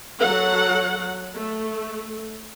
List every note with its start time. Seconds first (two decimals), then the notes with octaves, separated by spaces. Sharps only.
0.20 F#3 A4 F#5
1.35 A3